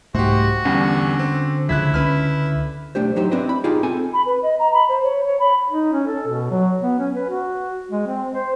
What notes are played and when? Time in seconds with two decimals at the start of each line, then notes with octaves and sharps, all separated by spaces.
0.15 C2 G#2 A3 F#4 G4 C5
0.65 E2 G2 D3 G3 C#4 F#5 G#5
1.19 C4
1.69 C#2 C#3 F3 E4 F#6 G#6 B6
1.94 C#2 G#3 C#4 B4 F6
2.95 B1 A3 D4 G4 C5
3.16 F#3 D#4 G4 C5
3.32 C4 D4 E4 G4 B4 D#5
3.49 B5
3.64 D#4 F4 G4 G#4 D5
3.83 C4 A4 G#5
4.13 B5
4.25 B4
4.41 D#5
4.59 A#5
4.73 B5
4.88 C5
5.03 C#5
5.24 C#5
5.39 B5
5.70 D#4
5.93 C#4
6.07 A4
6.28 B2
6.51 F#3
6.82 B3
6.99 C#4
7.15 B4
7.29 F#4
7.91 G#3
8.07 C4
8.32 C5